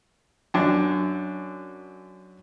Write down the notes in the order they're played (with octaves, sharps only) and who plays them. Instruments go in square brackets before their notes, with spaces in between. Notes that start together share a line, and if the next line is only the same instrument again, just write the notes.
[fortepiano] F#2 D4